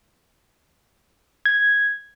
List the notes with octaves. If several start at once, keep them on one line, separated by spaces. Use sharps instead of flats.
G#6